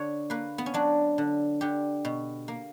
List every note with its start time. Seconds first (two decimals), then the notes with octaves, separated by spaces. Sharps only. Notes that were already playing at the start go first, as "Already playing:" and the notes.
Already playing: D3 C#5
0.30 A#3 B4
0.58 B3
0.66 C#4
0.74 F#3 D4
1.18 D3
1.61 D3 G4
2.05 B2
2.48 A#3